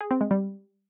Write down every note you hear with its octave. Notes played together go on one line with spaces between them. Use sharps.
G#4
C4
G#3
G3